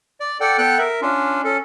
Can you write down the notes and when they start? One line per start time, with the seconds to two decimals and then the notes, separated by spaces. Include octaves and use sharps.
0.20 D5
0.40 A4 D5 F#5 G5
0.58 B3 A4 G5 F#6
0.78 A#4 E5
1.02 C#4 D4 F4
1.44 C#4 A4